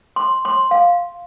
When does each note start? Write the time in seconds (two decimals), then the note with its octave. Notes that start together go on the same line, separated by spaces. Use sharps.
0.16 C6
0.45 C6
0.71 F5